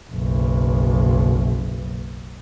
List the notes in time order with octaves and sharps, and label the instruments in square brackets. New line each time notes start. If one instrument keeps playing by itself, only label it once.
[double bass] F#1 B1